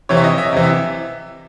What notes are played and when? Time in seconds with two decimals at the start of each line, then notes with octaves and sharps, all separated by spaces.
0.09 C3 E3 C#5
0.17 E5
0.24 D#5
0.38 E5
0.53 C3 E3
0.63 E5